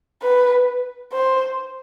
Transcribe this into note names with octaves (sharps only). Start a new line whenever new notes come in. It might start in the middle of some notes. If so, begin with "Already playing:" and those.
B4
C5